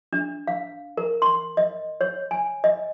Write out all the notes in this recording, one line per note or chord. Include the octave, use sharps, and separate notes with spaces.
D4
F5
A#4
C6
D#5
C#5
G#5
D#5